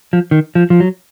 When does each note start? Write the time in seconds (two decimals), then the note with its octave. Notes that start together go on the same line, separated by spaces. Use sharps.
0.13 F3
0.31 D#3
0.55 F3
0.70 F3
0.80 F#3